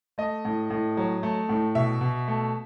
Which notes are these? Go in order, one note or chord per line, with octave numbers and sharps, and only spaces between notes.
A3 D#5
A2
A2
F#3
A3
A2
B2 E5
B2
A3